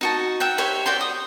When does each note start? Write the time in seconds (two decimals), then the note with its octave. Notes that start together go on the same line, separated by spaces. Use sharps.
0.01 D#4 F#4 A5
0.40 E5 F#5 G5
0.58 G4 C5 C#5 E5
0.86 F#4 D5 G5 C6
1.01 D#6